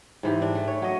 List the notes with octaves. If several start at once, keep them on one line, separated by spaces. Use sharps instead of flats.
G#2 E3 G4
D4
A3
C#5
F#3 D#5